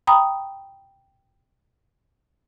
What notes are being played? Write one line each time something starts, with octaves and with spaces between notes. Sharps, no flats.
G5 A#5 B5 D#6